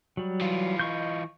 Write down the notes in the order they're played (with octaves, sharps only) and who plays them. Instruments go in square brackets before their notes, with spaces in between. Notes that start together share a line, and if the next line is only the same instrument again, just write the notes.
[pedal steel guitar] F#3 G3
[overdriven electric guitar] E3 F4
[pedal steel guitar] D#5 C#6 G6